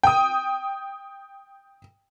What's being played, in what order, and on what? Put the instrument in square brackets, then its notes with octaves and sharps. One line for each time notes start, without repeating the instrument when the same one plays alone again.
[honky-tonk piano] G5 D#6